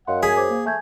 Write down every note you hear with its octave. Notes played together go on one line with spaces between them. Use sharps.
F#2 D#5 F5 F#5 C6
G#4 G#5 B6
C5 D6
A#3
A3 G#5 G6 G#6